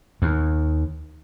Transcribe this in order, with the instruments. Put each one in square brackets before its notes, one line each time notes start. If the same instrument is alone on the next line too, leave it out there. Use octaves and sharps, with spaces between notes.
[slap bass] D#2